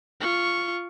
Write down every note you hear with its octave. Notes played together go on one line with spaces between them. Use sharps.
F4 C#6